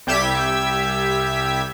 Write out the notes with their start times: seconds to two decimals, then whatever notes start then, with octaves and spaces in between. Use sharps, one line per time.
0.07 C2 G3 G4 E5 G#6 B6